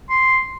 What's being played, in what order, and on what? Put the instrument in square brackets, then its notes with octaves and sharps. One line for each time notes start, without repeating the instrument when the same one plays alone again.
[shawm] C6